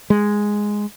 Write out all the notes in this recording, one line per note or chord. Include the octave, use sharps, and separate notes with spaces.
G#3